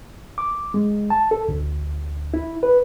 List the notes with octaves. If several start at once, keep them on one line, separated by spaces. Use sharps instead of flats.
D6
G#3
A5
A4
D2
E4
B4